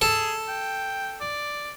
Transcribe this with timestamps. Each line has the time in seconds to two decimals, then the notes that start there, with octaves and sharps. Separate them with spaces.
0.02 G#4 A4
0.48 G5
1.21 D5